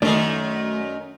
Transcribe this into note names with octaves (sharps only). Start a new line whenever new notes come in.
F#2 D#3 A3 D5